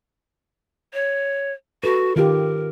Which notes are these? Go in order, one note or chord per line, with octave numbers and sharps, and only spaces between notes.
C#5
F#4 A4 B4
D#3 F4 G4 A#4